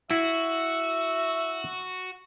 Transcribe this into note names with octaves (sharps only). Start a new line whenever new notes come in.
E4 F#4 E5